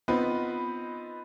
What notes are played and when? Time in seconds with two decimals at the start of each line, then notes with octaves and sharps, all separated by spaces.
0.08 B3 C4 D#4 F4 B4